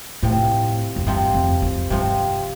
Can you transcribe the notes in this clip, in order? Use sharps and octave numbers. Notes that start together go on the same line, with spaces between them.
A2 C3 F3 C4
F2
G2 C3 F3 C4
F2
F2
G2 C3 F3 C4